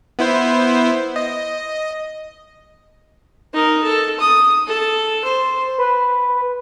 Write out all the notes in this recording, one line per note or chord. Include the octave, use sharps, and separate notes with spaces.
B3 E4 C5
D#5
D#4 A#4
A4
D#6
A4
C5
B4